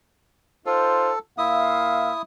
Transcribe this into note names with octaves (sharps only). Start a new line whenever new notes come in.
D#4 F4 A4 C5
A#2 E4 E5 F5 D#6